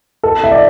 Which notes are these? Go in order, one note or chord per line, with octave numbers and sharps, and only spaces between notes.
A4
E5
D5